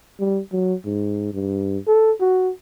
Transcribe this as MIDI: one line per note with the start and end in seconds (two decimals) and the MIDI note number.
0.19 0.40 55
0.52 0.74 54
0.85 1.32 44
1.34 1.78 43
1.87 2.12 69
2.20 2.51 66